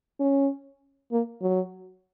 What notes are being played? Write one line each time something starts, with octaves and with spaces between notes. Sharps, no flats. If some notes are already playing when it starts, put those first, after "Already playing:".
C#4
A#3
F#3